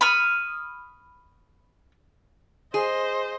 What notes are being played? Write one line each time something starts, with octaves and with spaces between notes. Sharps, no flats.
B5 C#6 D#6 F6
G#4 C5 D#5